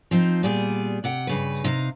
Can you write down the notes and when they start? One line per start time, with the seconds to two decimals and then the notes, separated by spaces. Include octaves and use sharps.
0.11 F3 C4 C#4 D#4
0.43 A#2 G3 B3 G#4
1.04 C3 F#5 G5
1.27 G2 C#3 B4
1.64 C3 D#4 D#5 F5